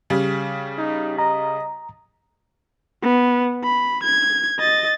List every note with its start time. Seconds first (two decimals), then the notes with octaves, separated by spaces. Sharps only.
0.10 C#3 G3
0.78 D#4
1.18 D#5 A#5
3.02 B3
3.63 B5
4.03 G#6
4.59 D#5 A6